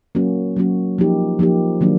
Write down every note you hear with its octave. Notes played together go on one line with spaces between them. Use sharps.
F#3 A#3 C#4 F#4
F#3 A#3 C#4 F#4
F3 A#3 D#4 G4
F3 A#3 D#4 G4
D#3 F#3 A#3 D4